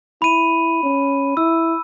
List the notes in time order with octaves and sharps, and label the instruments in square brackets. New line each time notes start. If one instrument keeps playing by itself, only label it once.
[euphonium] E4 [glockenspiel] B5 D#7
[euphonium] C#4
[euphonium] E4 [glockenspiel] E6